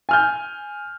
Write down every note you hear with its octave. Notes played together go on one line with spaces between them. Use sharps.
G#5 F6 G6